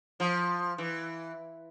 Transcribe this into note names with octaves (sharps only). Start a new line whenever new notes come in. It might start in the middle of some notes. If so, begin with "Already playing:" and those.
F3
E3